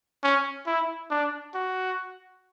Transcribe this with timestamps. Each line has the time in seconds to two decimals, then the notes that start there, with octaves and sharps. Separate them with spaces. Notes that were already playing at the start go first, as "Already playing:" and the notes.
0.23 C#4
0.67 E4
1.11 D4
1.55 F#4